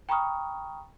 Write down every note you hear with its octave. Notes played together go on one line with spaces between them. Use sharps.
G5 A#5 B5 C#6 D#6 F6